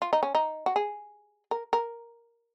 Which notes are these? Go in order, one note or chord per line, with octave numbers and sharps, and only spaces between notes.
F4
D#4
C#4
D#4
F#4
G#4
A#4
A#4